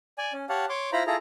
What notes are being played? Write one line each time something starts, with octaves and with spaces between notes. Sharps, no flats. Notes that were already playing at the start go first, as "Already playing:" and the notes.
D5 G#5
C#4
G4 C#5 F5 F#5 A5
C#5 C6 D6
E4 F4 C5 A#5 B5
E4 F4 G#4 A4 A#5